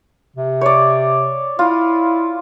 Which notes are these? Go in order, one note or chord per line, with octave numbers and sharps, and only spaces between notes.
C3
C#5 D5
E4 F4